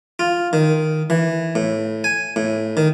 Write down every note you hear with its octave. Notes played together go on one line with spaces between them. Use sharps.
F4
D#3
E3
A2
G#5
A2
D#3